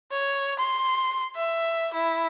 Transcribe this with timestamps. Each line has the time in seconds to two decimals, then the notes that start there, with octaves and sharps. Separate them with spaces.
0.11 C#5
0.59 C6
1.36 E5
1.93 E4